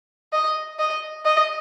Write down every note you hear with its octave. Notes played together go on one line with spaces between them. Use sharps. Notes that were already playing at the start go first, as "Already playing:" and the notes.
D#5
D#5
D#5